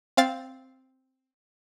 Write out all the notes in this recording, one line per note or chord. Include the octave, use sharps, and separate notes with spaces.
C4 F5 A6